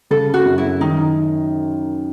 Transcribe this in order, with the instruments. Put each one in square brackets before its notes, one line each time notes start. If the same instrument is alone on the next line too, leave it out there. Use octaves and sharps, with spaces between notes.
[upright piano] C#3 [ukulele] A4
[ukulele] F#4
[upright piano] F#2
[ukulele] E4
[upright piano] D#3 [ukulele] D#4